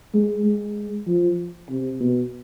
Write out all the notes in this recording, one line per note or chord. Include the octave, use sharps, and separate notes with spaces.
G#3
G#3
F3
C3
B2